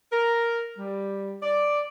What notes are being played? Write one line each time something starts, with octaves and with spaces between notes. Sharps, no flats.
A#4
G3
D5